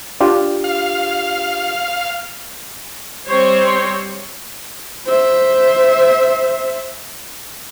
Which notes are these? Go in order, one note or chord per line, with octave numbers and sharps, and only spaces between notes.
D4 F4 G4
F5
G3 C4 C5 C#5
C5 E5